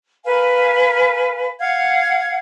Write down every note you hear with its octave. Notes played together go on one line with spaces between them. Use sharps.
A#4 B4 F5 G#5
F5 F#5 G#6